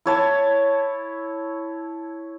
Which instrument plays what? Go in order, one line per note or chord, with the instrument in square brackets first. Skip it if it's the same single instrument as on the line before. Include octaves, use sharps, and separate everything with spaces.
[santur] E4 C#5 A5